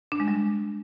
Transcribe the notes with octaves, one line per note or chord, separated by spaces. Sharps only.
D4
G#3
G3